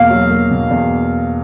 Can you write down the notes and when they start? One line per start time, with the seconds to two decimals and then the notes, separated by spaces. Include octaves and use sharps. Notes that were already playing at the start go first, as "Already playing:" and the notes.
Already playing: E2 B2 A#3 F5
0.10 F#3
0.30 A#3
0.51 B2
0.71 E2